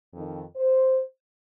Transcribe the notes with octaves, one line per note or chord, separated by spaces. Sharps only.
F2 D#3
C5